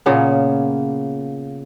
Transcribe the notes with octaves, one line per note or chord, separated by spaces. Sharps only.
A#2 C#3 A#3 B3